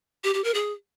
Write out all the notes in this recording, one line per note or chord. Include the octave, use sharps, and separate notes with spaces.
G4
G4
A#4
G#4